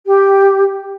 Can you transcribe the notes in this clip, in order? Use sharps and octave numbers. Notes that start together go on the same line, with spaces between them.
G4